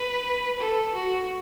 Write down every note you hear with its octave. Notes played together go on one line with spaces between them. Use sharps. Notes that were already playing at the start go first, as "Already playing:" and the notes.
Already playing: B4
A4
F#4